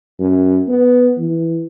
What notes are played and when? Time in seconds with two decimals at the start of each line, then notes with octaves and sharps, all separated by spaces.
0.19 F#2
0.68 B3
1.19 E3